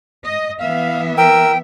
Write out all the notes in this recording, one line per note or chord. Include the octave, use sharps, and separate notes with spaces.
D#5
E3 B3 E5 F5
A#4 G5 E6